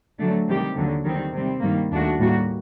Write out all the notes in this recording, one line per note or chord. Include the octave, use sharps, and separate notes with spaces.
D3 F#3 A3 D4
C3 D#3 G3 C4 G4
D#2 D3 F#3
D#3 G3 C4
C3 G3 C4
G2 D#3 G3 A#3
D#2 D#3 A3 D4 F#4
A2 G3 A#3 F#4